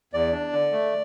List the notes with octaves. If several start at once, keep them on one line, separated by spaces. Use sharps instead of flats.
E2 D5
D4
D3
A3